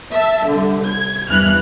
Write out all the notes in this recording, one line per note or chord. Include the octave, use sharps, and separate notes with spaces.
E5 A5
C2 D3
G#6
E2 G2 E3 F6 F#6